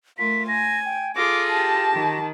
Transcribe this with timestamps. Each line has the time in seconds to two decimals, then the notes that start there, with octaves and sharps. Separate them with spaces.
0.18 A3 F4 A#4 B6
0.48 G#5 A#6
0.85 G5
1.16 F4 G#4 A4 D6 A#6
1.51 G4 A5
1.92 D#3